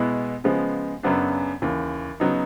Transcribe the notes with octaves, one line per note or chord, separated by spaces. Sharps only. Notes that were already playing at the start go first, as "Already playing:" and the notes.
Already playing: B2 G#3 B3 E4
C#3 F3 G#3 B3
F#2 C#3 F#3 B3 D4
D#2 C#3 E3
C#3 F#3 B3 D#4